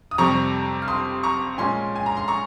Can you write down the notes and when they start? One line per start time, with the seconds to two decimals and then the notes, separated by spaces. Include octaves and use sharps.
0.11 D#6
0.18 F2 C3 G3 A#5 C#6
0.82 F6
0.88 C6 D#6
1.23 A#5 C#6
1.58 A#2 G#3 C#4 G#5 C6
1.96 G#5
2.06 A#5
2.17 C6
2.28 A#5 C#6